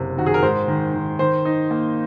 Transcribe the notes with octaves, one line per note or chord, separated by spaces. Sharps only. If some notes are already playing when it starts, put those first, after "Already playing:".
Already playing: F#1 C3
D#3 F#4
G#4
A#4
G#2 C5
D#3
D#3
D#3 C5
D#4
A#3